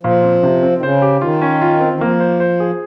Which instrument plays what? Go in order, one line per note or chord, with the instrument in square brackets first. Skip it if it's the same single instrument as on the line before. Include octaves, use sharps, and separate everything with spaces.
[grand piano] A#2 [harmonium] F3
[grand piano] C4
C3
C4
[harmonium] D#3
[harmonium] C#3 [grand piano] C5
[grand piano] G4
[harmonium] D#3 [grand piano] F4
[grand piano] C#4
F4
C4
[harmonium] D#3
[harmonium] F3 [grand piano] A#3
[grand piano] C5
C5
G#4